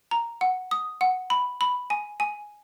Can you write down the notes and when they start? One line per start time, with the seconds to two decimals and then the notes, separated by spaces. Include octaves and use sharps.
0.11 A#5
0.41 F#5
0.71 D#6
1.01 F#5
1.30 B5
1.61 B5
1.90 G#5
2.20 G#5